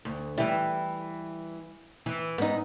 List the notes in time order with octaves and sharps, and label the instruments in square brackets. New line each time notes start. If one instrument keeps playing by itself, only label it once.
[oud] D2
[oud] E3 G3 [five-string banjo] E4
[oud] E3
[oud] G#2 [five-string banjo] B3 D#4